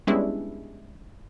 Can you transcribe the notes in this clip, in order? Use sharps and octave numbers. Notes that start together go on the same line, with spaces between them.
G3 G#3 B3 C#4 D4 E4